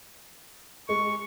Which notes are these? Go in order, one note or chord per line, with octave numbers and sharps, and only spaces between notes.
G#3 C#6